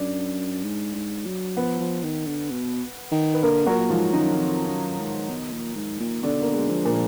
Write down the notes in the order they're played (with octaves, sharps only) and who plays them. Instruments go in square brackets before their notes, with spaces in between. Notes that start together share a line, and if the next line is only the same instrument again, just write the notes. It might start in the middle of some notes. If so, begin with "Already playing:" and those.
Already playing: [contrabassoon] F#2 [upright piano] D4
[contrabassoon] G#2
G#2
F#3
[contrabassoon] F3 [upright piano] B3 B4
[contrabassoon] F3
D#3
D3
B2
D#3
[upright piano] B4
[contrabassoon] D3 [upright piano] A#3 A#4
[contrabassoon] A#2 [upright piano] F#3 F#4
[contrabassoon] G#2 [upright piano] F3 F4
[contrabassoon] F#2 [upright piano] D#3 D#4
[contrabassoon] F2
F#2
G#2
B2
A#2
G#2
A#2
[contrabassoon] B2 [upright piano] D3 D4
[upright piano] A#3
G#3
[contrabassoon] F3
[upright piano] A#2 A#3